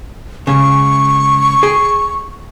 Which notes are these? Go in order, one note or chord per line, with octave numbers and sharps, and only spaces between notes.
C#2 G#2 C#3 C#6
G#4 G5